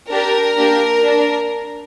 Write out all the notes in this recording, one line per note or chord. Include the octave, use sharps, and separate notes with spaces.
D4 G4 A#4
A#3 D4 G4
D4